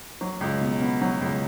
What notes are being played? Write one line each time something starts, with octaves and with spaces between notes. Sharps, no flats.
F#3
C#2
B2
B3
F#3
C#2